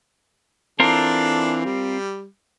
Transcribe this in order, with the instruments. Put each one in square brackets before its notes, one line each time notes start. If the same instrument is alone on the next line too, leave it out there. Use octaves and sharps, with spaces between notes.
[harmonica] E3 D4 A4 [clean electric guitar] C4 F4 A#4
[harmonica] G3